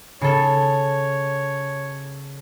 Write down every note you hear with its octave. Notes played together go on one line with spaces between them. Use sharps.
C#3 A4 C#5